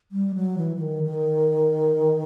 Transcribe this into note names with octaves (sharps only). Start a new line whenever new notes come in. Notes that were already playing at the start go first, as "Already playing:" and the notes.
G3
F#3
E3
E3
D#3
D#3